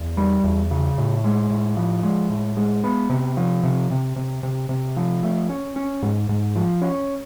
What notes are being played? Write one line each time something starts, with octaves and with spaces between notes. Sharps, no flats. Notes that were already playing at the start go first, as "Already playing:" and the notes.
Already playing: E2
G3
E2
C#3
A2
G#3
A2
F3
G#3
A2
G#3
B3
C3
F3
C3
C3
C3
C3
C3
F3
A3
C#4
C#4
G#2
G#2
F3
C#4